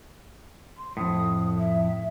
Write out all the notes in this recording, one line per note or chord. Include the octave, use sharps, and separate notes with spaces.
C6
F2 A2 D#6
E5